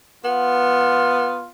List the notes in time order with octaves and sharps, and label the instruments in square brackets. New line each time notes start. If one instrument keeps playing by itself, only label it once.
[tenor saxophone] B3 [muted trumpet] F4 [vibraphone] F#5